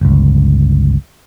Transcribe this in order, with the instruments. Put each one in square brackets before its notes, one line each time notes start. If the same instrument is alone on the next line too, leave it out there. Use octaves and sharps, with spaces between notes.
[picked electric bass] G1 C#2